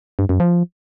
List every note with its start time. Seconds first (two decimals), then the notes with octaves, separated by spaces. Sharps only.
0.19 G2
0.29 F#2
0.40 F3